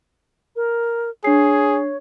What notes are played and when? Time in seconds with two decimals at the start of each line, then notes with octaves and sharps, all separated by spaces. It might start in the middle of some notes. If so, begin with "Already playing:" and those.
0.56 A#4
1.24 D4 G#4 C#5 C7